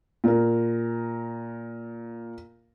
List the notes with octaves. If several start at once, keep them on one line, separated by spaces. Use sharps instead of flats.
A#2 A#4